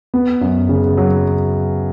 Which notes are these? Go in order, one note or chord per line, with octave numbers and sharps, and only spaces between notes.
B3
F#2
C#3
F#3